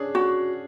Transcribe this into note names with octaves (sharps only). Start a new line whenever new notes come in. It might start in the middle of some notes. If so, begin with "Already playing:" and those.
Already playing: C#4 D4 G#4
F#4